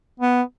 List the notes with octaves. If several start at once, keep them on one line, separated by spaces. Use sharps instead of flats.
B3